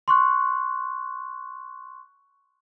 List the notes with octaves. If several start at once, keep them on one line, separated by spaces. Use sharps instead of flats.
C6 C#6 F#6